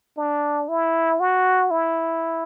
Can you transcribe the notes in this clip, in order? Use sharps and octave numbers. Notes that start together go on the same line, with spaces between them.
D4
E4
F#4
E4